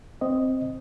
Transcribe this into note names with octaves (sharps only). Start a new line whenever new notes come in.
C4 D#5